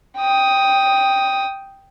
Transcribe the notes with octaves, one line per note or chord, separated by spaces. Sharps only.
G5 D#6